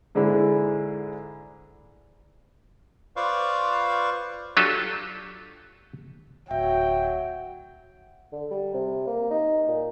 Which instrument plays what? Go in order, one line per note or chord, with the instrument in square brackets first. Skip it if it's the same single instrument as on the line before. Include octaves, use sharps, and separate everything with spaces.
[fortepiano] G#2 D3 G#3 E4
[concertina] F4 B4 C5 D5 F5 C#6
[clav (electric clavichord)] F#3 D4 F4 G4 A4
[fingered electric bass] D1 [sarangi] F#3 [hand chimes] E5 [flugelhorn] G5
[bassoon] D3
G3
C3
A#3
D#4
A#2